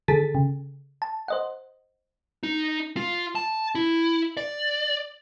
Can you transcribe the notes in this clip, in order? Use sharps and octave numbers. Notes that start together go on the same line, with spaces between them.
D3 D#3 G#4 A4 A6 B6
C#3
A5
C5 D#5 F#5
D#4
F4
A5
E4
D5